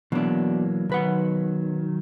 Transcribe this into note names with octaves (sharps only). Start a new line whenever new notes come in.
B2 E3 F#3 A#3 D4
B1 D#3 F#3 B4 F#5